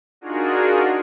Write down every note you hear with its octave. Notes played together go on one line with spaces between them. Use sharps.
D4 D#4 F4 F#4 G#4 A#4